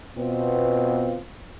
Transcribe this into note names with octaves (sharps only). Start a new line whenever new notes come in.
B2 B3 C4 F4